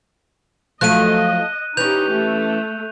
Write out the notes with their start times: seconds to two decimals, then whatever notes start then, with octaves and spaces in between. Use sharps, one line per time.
0.81 F3 F#3 A3 D#5 F#6 D#7
1.77 E3 C#4 D#4 G4 G6 F7
2.13 A3